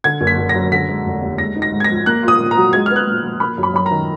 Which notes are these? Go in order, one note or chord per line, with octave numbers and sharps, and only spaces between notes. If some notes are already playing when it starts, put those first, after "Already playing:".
D3 G#6
F#1
B6
F#1
A#6
F#2
D3 B6
G#3
F1
D#2
G#3 A#6
D#4
A#6
G#2
G#6
F3 A#6
A#3 F#6
F4
D#6
A#2
A#5
F#3
G#3 G#6
B3 F6
F#6
A#2
F3
A#3 B5
F#2
B5
F#2 B5
A#5
D#3